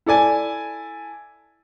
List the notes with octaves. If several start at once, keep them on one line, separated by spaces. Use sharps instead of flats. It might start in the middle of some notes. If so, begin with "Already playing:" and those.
E4 A4 D5 G#5